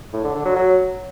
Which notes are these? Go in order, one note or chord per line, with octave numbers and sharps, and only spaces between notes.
A2
D3
D3
F#3
F#3